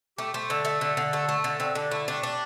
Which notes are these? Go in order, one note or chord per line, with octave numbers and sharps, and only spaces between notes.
A3 G4
A3 C5
D3 A4
A3
D3
D3
A3
A3
D3
D3 C4
D3 D4
A3 E4
D4 G4
D4